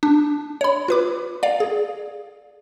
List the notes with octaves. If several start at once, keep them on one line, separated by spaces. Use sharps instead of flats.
D4
C#5 B5
F4 B4 D6
D5 F5
G#4